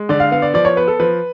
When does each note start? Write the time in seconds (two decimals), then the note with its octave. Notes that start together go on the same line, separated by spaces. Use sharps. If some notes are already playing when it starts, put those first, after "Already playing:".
Already playing: G#3
0.09 D3 D5
0.20 F5
0.31 B3 F5
0.42 D5
0.54 F3 D5
0.65 C#5
0.76 B3 B4
0.88 A4
1.00 F3 B4